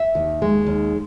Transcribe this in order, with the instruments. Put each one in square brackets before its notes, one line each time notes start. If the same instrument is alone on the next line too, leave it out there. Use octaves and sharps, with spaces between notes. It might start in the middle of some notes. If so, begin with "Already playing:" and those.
Already playing: [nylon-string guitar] E5
D#2
G#3
D#2